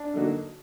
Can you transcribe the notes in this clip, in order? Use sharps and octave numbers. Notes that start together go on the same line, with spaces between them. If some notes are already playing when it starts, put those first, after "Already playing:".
Already playing: D4
D3 F#3 A#3 D#4 F#4